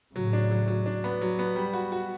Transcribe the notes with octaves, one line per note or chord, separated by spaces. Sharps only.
A2 C#3 F#3
D4
F#3
F#3
D4
B3
F#3
B3
G3
F#4
F#4